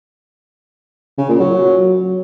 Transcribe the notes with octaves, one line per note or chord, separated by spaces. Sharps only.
C#3
A#2
F#3